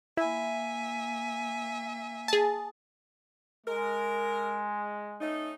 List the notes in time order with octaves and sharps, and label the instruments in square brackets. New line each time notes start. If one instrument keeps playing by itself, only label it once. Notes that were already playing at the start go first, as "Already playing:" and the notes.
[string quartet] A#3 E5 G#5 [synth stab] E4
[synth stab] G#4 A5
[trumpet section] G#3 [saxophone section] A#4
[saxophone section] A3 C#4 D#4